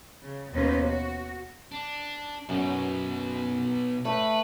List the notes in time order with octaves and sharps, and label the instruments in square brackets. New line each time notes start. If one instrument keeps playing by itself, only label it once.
[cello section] C#3
D#2 B2 C#4 D#4 B4 C5
F#4
[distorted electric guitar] D4
[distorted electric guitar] B1 B2 [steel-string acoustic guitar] F#2
[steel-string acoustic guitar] A3 [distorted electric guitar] B4